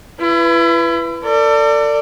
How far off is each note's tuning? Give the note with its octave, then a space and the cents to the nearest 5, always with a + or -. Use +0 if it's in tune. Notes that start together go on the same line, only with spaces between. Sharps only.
E4 +35 B4 +0
A4 +40 D5 +0